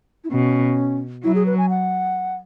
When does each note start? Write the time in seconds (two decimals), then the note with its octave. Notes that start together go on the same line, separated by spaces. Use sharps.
0.24 E4
0.31 B2 C#4
1.24 F#3 E4
1.35 G#4
1.46 B4
1.58 G#5
1.69 F#5